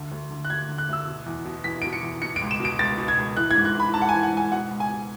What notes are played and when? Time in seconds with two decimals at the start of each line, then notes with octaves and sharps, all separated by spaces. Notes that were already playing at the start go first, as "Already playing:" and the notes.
Already playing: D2 D3
0.11 D2
0.30 D3
0.45 F#6
0.50 D2 G#6
0.69 D3
0.78 F#6
0.88 D2 E6
1.07 B2
1.26 E2
1.45 B2
1.64 E2 B6
1.82 B2 D7
1.93 C#7
2.03 E2
2.22 B2 C#7
2.36 D7
2.41 C#2
2.51 E7
2.60 B2 D7
2.79 C#2 A6
2.98 B2
3.08 G#6
3.18 C#2
3.37 E3 F#6
3.51 G#2 G#6
3.65 F#6
3.75 E3 B5
3.94 G#2 A5
4.02 F#5
4.09 E3 G#5
4.23 F#5
4.32 G#2 G#5
4.52 B2 F#5
4.71 C#2
4.80 G#5
4.90 B2